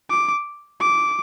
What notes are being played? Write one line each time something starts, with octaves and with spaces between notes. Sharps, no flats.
D6
D6